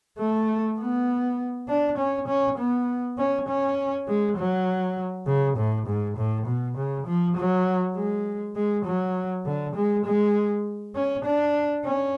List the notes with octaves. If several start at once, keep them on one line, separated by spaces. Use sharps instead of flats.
A3
B3
D4
C#4
C#4
B3
C#4
C#4
G#3
F#3
C#3
A2
G#2
A2
B2
C#3
F3
F#3
G#3
G#3
F#3
D3
G#3
G#3
C#4
D4
C#4